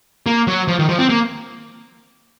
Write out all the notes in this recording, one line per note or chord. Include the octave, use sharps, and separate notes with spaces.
A#3
F#3
F3
D#3
F3
C4
A#3